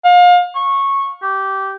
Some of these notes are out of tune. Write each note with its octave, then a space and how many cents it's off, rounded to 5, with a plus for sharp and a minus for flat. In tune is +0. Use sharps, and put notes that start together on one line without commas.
F5 +30
C#6 -10
G4 -15